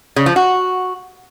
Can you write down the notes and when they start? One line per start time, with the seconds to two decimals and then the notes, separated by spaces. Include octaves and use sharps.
0.16 C#3
0.26 F3
0.36 F#4